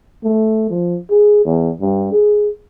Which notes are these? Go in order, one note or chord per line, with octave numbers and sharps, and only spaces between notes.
A3
F3
G#4
E2
G2
G#4